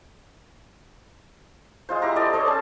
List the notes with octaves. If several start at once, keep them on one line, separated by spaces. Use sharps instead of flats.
G#3 F4 C5
E4 G4 A#5
A4 D5 D#5 G#5
A4 C5 C#5 D#5
C#4 G#4 A5